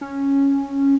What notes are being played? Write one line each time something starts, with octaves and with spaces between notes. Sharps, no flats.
C#4